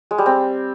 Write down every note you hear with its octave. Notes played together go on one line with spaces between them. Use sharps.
G#3
G3
C4